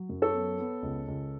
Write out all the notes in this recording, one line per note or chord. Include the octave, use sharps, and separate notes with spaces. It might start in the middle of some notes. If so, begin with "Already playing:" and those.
Already playing: F#3
F#2
A4 C#5
B3
B3
C#2
C#2